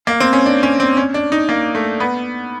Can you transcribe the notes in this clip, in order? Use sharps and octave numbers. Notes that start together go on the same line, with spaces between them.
A#3
C4
C#4
D4
C#4
C4
C#4
D4
D#4
A#3
A3
B3